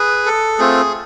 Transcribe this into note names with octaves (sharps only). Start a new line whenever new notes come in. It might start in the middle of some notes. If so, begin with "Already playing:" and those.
Already playing: G#4 B4
A4
A3 C4 F4 G#4